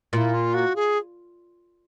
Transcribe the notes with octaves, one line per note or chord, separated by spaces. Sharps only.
A#2 E4 F4
F4
F#4
G#4